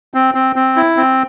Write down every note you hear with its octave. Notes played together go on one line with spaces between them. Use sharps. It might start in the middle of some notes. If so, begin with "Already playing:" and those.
C4
C4
C4
E4
C4